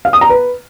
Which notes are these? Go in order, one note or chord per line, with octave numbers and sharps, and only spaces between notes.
F5
D#6
A#5
B4